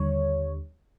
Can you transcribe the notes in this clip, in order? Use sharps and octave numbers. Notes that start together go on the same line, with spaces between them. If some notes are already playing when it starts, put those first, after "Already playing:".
Already playing: D#2 D3 G3 C#5